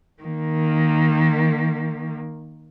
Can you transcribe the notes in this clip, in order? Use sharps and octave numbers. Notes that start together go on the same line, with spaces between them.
D#3 A#3